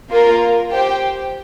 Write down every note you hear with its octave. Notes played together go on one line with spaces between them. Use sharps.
A#3 F4 A#4
G4 C5 G5